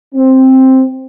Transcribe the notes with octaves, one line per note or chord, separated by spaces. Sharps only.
C4